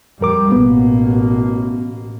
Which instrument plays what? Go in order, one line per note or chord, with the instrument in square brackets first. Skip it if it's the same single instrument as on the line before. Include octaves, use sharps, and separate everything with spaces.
[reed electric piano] F2 A#4 D6 [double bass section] G3
[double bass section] A1 B2 A#3 [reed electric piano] B3